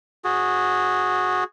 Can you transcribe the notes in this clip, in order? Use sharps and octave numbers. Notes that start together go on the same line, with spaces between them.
F#4 G#4